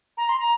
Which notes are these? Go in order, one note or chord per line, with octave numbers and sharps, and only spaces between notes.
A#5
C6
A#5